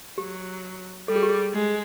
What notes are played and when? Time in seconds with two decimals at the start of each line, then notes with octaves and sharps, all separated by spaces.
0.17 F#3 G4
1.08 G3 A4
1.16 G#4
1.23 G4
1.30 G#4
1.54 G#3